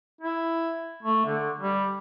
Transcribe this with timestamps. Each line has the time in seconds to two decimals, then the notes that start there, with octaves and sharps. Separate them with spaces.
0.21 E4
1.03 A3
1.26 D3
1.61 G3